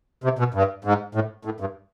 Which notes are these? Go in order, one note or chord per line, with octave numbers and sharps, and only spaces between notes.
C3
B2
G2
G#2
A2
A2
G2